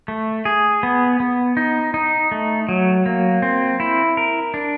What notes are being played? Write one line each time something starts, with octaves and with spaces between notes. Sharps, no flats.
A3
G#4
B3
B3
D#4
D#4
A3
F#3
A#3
C4
E4
A#4
D4